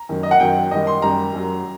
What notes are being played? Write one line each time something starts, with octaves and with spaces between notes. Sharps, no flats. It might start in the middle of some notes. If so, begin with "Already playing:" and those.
Already playing: A#5
F#2 D#3 F#3
D#5
F#5
F#2 D#3 F#3 G5
F#2 D#3 G3 D#5
C6
F#2 D#3 G3 A#5
F#2 F#3